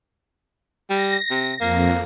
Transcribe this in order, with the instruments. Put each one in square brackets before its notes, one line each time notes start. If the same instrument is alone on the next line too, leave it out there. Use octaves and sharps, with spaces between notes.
[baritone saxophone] G3 [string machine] A#6
[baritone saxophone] C3
[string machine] F2 [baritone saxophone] A#3